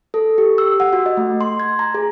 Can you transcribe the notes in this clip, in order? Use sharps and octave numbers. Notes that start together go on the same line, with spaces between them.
A4
G4
E6
F#5
F#4
D#5
A3
C6
G#6
A#5
G#4